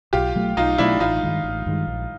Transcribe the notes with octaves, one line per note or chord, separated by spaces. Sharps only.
B1 F4 G4
B2 F#3 A3
B1 D#4 F4
B2 F#3 A3 D4 E4
A1 D#4 F4
G2 D#3 G#3
A1
G2 D#3 G#3
A#1